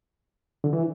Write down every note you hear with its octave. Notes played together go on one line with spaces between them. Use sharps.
D3
E3